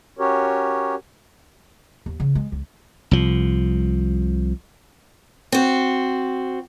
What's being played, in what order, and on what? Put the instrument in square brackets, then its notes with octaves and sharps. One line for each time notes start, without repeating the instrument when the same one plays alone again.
[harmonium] C#4 F#4 G4 A#4 C#5
[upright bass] D#2
C#3
G#3
C#2
[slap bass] C2 F3
[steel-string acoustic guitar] C4 F#4